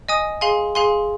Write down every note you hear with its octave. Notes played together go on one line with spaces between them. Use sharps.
D#5 G#5 D#6
G#4 F5 G#5 C6
G#4 F5 G#5 C6